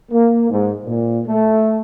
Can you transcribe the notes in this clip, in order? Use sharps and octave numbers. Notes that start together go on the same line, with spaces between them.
A#3
G#2
A#2
A3